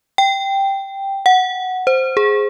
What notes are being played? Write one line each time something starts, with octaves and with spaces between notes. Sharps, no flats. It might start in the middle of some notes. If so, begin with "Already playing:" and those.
G5
F#5
C5
G#4